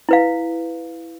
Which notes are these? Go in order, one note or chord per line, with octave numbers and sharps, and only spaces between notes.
E4 B4 F5